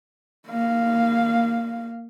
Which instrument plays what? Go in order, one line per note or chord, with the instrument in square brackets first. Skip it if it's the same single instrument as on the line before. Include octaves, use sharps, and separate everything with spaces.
[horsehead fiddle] A#3 F5